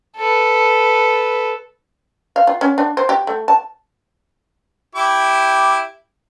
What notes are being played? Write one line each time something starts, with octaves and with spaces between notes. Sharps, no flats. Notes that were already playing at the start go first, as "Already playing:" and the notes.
A4 B4
F5
F4
C#4
D4
C5
G4
A3
A5
E4 G4 D6